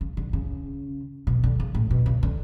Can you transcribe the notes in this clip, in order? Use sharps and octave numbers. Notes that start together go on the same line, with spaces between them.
C#3
D3
C#3
B2
D3
C#3
A2
B2
C#3
D3